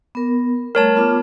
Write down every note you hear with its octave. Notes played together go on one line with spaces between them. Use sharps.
B3 A#4
G3 A3 A#4 C#5 A5
B3 F4 D6